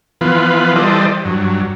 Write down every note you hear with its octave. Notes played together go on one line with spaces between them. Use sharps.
E3 F3 B3 F4 B4
E3 G3 A4 C5 D5 D#5
G2 F#3